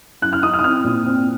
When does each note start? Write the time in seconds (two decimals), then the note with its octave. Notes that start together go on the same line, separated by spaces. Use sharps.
0.22 F#2 F#6
0.33 F6
0.43 D#4 D#6
0.54 F6
0.59 D#6
0.64 C4 F6
0.84 A#2
1.06 C4